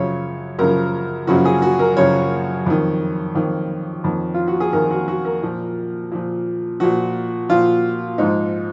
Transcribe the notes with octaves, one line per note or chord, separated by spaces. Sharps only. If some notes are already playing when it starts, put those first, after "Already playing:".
Already playing: F#2 C#3 F3 C#5
F#2 C#3 F3 A#4
F#2 C#3 F3 F#4
G#4
F#4
A#4
F#2 C#3 F3 C#5
F2 D#3
F2 D#3
F2 D#3
F4
F#4
G#4
F2 D#3 A#4
F#4
F#4
A#4
A#2 F3
A#2 F3
A#2 F3 F#4
A#2 F3 F4
G#2 F3 D#4